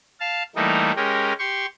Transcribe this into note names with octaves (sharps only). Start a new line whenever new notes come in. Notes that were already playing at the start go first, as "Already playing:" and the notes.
F5 A5
E3 G3 A3 A#3 D#4
G#3 C#4 G4 A#4
G4 C6 C#6